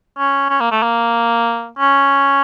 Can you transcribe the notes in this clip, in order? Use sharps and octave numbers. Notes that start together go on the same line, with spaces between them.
C#4
C#4
A#3
A3
A#3
C#4